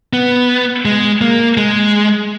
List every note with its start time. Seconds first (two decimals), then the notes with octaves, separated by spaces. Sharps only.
0.13 B3
0.85 G#3
1.21 A#3
1.57 G#3